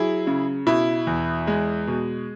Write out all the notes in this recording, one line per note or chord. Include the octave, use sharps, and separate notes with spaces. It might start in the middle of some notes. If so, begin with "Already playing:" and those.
Already playing: F#3 E4 G#4
C#3
B2 E4
E2
G#3
B2